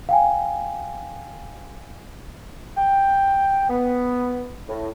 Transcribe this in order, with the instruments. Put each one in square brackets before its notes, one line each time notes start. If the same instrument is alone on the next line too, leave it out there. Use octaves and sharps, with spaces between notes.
[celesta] F5 G5 G#5
[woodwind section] G5
B3
A2